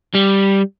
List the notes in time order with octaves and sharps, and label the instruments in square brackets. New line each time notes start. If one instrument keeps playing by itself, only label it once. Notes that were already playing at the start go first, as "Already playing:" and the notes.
[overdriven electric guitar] G3